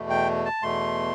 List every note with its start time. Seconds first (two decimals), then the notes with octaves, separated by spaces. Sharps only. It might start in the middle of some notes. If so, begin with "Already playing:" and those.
Already playing: E2 B2 A3
0.10 G5
0.45 A5
0.62 E2 B2 A3 C6